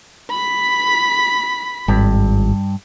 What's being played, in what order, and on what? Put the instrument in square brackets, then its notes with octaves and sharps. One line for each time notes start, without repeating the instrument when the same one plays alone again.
[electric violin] B5 B6
[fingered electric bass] G#1 [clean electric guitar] G2